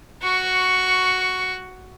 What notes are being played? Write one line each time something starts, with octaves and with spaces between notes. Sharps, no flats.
F#4 C#6